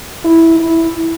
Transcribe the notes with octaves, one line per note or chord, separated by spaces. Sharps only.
E4
E4